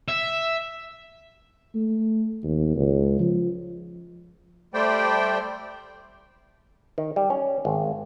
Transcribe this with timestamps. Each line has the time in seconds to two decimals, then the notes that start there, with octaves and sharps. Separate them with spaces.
0.08 E5
1.75 A3
2.43 D#2
2.76 C#2
3.20 F3
4.74 G3 A3 C5 D5 G5
6.98 D#3
7.16 G3
7.30 C#4
7.65 G#1